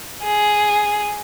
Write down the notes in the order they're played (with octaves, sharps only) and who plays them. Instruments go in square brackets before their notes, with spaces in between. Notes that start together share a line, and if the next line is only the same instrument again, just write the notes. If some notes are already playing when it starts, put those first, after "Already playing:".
[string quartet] G#4